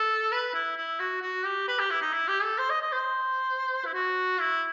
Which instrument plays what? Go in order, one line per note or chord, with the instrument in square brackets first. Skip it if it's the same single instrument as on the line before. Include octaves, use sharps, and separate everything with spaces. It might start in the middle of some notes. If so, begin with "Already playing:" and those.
Already playing: [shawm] A4
B4
E4
E4
F#4
F#4
G4
B4
G4
E4
D#4
E4
G4
A4
C5
D#5
D#5
C5
E4
F#4
E4